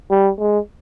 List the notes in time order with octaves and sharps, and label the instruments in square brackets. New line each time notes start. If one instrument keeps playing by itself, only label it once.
[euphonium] G3
G#3